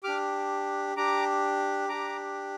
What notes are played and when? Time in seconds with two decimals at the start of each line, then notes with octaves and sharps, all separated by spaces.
0.04 D4 G4 D6 F6
0.96 D4 G4 A#5 D6
1.89 D4 G4 A#5 D6